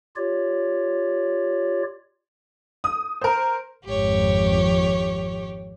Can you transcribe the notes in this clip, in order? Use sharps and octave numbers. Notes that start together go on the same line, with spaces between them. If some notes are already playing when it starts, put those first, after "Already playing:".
F4 G4 C#5 D5
D#6
A#4 C5
G#1 F2 G4 C#5